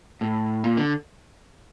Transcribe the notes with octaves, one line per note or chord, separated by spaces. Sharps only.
A2
A#2
D3